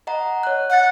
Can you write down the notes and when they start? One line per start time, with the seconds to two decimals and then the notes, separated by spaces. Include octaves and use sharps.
0.07 D#5 F#5 A#5
0.43 C#5 F#6
0.70 F#5 F#6 A6